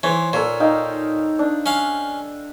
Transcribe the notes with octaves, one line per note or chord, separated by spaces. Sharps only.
E3 C5 C#5
A#2 A4 C#5
D#4 F5 G5
D4
C#4 F5